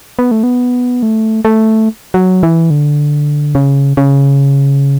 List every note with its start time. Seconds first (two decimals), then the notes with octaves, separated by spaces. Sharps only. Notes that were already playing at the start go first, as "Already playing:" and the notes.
0.19 B3
0.31 A3
0.43 B3
1.03 A3
1.45 A3
2.14 F#3
2.43 E3
2.70 D3
3.55 C#3
3.97 C#3